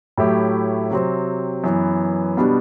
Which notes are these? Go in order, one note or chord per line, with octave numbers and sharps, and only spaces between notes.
A2 F#3 A3 E4 G4
C3 F#3 C4
F#2 E3 B3
B2 G3 B3 D4